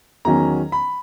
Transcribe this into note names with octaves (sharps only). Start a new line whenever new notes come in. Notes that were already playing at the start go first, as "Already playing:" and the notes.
E2 D#3 F#3 C#4 A#5
B5